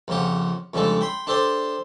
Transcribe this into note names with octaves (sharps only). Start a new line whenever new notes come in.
A#1 F2 C#3 G4 F#5
F2 C#3 G3 G#3 D4 A4
G5 B5 C6
D4 G4 A4 C5 D5 C6